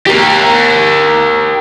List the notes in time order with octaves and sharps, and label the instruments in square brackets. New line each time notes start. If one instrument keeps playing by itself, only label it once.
[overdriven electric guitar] G4 A#4